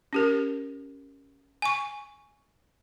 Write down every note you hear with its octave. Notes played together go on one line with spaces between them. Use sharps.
C#4 G4 A#4
G#5 C#6